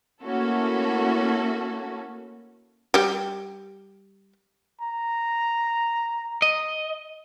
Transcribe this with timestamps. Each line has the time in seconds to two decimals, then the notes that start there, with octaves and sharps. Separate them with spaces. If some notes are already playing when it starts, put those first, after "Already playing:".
0.24 A3 A#3 C#4 E4 F#4 A4
2.94 G3 G4
4.81 A#5
6.42 D#5